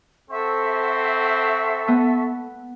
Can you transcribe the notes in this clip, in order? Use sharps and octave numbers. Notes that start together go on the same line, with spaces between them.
C4 A4 E5 F#5 C#6
B3